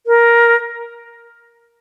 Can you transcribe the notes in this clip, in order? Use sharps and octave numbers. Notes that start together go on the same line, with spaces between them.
A#4